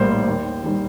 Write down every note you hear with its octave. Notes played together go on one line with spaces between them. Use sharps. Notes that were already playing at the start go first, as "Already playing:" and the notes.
Already playing: A#1 A2 G3 A#3 C5
D#2
D#3 G3